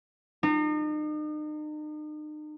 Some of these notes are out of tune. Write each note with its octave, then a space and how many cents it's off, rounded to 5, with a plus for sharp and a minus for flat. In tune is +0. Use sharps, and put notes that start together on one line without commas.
D#4 -40